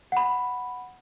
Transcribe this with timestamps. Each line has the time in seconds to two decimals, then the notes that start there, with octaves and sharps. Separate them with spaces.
0.12 F#5 B5